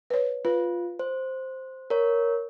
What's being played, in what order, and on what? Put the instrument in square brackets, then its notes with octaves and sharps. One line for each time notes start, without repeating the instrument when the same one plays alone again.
[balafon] B4 C#5
[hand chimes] F4 [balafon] B4
[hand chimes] C5
A#4 C#5